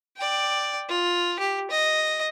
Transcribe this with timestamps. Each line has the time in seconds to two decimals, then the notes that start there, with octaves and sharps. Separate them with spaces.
0.17 D5 G5
0.89 F4
1.39 G4
1.71 D#5